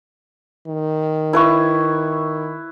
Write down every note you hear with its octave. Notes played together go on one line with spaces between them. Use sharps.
D#3
E4 B4 C#6